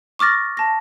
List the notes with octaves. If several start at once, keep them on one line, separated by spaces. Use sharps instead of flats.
C#6 D6 F6 A6 A#6
A5 A#6